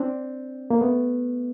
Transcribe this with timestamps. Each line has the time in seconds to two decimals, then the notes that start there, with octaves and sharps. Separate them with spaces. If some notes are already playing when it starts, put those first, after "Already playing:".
Already playing: C4 D4
0.70 A#3
0.81 A3 B3